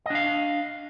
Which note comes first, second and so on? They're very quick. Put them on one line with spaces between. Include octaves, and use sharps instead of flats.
D#5 D4 F5